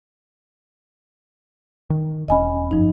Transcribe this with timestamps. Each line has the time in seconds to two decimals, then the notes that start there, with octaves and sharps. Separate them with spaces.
1.90 D#3
2.28 E1 C#4 D#5 G#5 B5
2.71 F#1 G2 F3 D#4